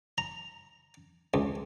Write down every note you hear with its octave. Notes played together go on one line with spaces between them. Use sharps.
A#5
C#2